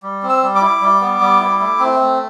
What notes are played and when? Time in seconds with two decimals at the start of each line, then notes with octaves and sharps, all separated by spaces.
0.03 G3
0.23 C4
0.29 E6
0.42 G3
0.55 D6
0.61 E4
0.81 G3
1.01 B3
1.21 G3
1.40 E4
1.60 A3
1.79 C4
1.99 A3